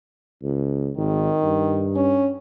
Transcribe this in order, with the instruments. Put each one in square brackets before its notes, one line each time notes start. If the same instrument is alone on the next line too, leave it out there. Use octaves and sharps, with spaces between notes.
[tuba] C#2
[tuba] G#1 [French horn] D#3
[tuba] G2
[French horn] C#4